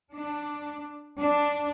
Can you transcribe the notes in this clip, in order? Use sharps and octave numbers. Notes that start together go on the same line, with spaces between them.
D4
D4